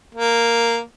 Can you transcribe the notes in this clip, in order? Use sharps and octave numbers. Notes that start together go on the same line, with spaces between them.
A#3